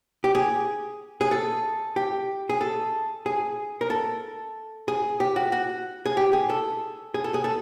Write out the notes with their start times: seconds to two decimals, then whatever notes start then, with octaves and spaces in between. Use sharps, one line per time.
0.24 G4
0.35 G#4
1.21 G#4
1.31 A4
1.96 G4
2.49 G#4
2.61 A4
3.26 G#4
3.81 A#4
3.90 A4
4.88 G#4
5.20 G4
5.36 F#4
5.52 F#4
6.06 G#4
6.17 G4
6.33 G#4
6.50 A4
7.14 G#4
7.24 A4
7.34 G#4
7.44 A4